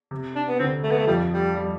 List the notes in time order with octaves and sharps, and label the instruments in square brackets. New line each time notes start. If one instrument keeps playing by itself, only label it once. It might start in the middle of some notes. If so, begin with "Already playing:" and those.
[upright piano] C3
[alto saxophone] D4
B3
[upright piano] D2 D3 [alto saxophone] C4
[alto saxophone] A3
B3
A3
[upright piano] F2 F3 [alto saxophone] G3
[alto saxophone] G3
[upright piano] G3